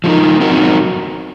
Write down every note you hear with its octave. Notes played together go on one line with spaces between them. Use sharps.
F3 G#3 D#4 A#4
F#3 C4 D#4 F#4 A#4